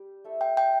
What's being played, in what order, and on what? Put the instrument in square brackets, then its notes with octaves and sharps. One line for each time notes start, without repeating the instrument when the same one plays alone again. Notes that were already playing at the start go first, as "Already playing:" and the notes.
Already playing: [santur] G3 G4
A3 E4 A4 E5
[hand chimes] G5
G5